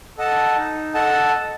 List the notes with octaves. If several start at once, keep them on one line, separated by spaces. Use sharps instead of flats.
A4 D#5 F#5 A5
D#4
A4 D#5 F#5 A5